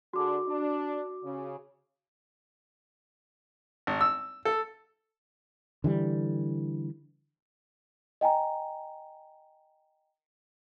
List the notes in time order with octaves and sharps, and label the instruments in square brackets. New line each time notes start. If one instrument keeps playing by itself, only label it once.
[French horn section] D3 D4 G#4 [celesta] F#4 D6
[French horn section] D4
C#3
[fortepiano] G#1
E6
A4
[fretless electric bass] D3 E3 G3
[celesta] D#5 G5 G#5 A#5